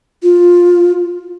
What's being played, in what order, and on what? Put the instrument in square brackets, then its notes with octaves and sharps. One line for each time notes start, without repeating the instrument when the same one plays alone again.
[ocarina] F4